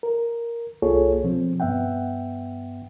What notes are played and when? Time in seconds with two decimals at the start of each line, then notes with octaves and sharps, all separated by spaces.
0.03 A#4
0.82 C2 A#3 F4 G#4 A4 C#5
1.24 B2 F3 C4
1.60 G2 B3 E5 F#5 G5